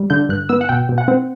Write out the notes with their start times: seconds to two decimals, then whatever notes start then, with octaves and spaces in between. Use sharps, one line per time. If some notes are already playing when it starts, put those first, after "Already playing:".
Already playing: G3
0.10 D3 G6
0.29 G2 F#6
0.49 B3 E6
0.61 F#5
0.69 B2 G5
0.89 B2
0.98 F#5
1.08 C4